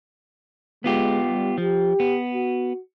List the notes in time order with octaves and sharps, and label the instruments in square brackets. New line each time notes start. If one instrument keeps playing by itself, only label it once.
[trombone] G#3 [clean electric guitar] B3 F4 G4
[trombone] G3
[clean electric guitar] F3 [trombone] G4
[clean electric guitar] B3
[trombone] F#4